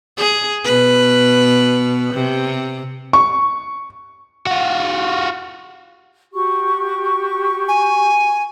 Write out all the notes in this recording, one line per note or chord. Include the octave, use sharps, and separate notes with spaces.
G#4
B2 B4
C3
C#6
F4 F#4
F#4 G4 C#6
G#5